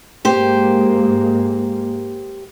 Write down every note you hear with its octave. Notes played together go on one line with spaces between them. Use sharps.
G#2 G#3 A#3 G4 C5